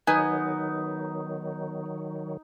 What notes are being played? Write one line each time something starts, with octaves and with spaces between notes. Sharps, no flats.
D#3 F#3 B3 D#4 G#5